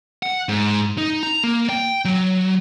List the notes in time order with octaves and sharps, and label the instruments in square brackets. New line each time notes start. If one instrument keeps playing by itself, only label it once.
[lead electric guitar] F#5
G#2
D#4
A#5
A#3
G5
F#3